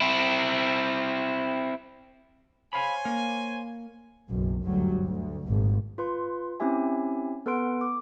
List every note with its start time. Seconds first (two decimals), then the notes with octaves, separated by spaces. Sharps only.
0.01 C4 E4
2.73 C5 C#5 F5 G#5 B5
3.05 A#3 A#4
4.28 F#1 B1 F#2
4.63 G1 D2 F#3 G3
5.04 D2
5.48 G#1 G2 A#2
5.98 F4 B4 C6
6.60 C4 C#4 E4 G4 E5 G#5
7.46 B3 A4 B4 F#5 C6 D7
7.81 D6